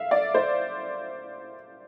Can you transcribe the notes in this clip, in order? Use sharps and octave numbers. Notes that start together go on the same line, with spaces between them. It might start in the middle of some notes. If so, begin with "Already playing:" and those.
Already playing: E5 F5
D5
C5